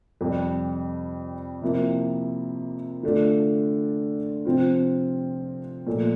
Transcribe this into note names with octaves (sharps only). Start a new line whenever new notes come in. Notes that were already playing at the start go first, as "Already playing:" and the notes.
F2 C3 G3
C3 F3 A#3 E4
D3 A3 D4 F4
C3 F3 C4 F4
A#2 F3 A3